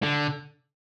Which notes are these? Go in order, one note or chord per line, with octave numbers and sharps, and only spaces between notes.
D3